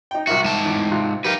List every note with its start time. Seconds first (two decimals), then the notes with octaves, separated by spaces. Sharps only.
0.11 D#4 G5
0.27 C2 F#4 A#4 E5
0.44 G#2 A5
0.66 E2 A2
0.91 C3 F4 F#6
1.24 D#4 G4 A#4 B4 F5